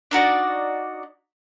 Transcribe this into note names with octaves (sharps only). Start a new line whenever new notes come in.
D4 D#4 F#4 D5